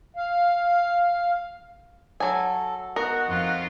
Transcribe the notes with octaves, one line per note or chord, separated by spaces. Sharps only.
F5
F#3 A4 G#5
B3 F#4 A#4 D#5 F#5
F2 D#4 F4